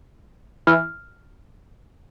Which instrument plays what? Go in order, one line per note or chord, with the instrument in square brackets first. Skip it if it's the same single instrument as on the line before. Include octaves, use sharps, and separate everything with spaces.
[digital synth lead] E3 [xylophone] F6